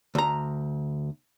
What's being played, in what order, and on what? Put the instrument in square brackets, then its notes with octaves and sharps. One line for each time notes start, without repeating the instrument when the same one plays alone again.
[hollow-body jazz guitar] D2 A#5